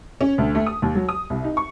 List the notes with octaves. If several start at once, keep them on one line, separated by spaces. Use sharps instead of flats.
C#4
D2
A3
D#6
D#2
F#3
D#6
C2
D#4
C#6